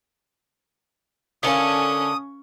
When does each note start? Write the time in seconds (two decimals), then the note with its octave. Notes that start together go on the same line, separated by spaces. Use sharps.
1.43 D3 C#4 E4 A4 A#4 F5 G#5 D#6